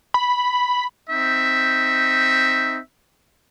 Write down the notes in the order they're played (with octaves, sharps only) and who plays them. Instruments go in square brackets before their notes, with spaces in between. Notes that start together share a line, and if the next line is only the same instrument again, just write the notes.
[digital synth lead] B5
[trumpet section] C4 D#4 E5